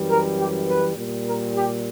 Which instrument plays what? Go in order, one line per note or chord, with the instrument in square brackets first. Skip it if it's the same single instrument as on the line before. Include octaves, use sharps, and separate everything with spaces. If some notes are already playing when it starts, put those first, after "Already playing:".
Already playing: [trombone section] F#2 E3 G3
A#4
G4
B4
A#2 G3
A#4
G4